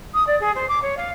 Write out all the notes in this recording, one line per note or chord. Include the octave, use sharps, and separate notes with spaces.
D#6
D5
G#4
C5
D6
C#5
F5